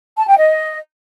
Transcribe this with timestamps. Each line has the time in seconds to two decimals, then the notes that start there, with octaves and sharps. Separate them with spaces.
0.16 A5
0.28 G5
0.39 D#5